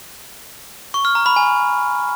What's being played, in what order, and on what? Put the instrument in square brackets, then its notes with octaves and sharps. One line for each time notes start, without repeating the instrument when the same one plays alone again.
[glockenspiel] C#6
F6
A#5
B5
G#5